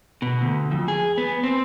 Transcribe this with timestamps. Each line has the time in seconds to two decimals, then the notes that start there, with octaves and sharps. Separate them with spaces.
0.22 B2
0.41 D2
0.71 F2
0.88 G#4
1.18 B3
1.43 C4